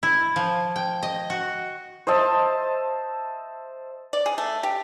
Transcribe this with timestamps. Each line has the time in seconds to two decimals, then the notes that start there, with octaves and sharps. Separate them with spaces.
0.03 E4
0.36 F3
0.76 G5
1.03 D#5
1.30 F#4
2.07 C5 D#5 E5 A5
4.13 D5
4.26 G#4
4.38 A3
4.63 G4